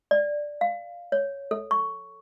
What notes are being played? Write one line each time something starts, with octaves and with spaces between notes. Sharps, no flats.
D5
F5
C#5
A4
C#6